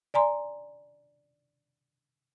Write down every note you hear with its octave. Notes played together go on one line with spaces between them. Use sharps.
D5 G#5 A#5 C6